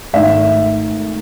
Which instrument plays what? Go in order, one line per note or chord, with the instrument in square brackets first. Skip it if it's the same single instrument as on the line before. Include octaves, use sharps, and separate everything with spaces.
[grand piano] G#1 G#2 D#3 A3 D#4 [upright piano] E5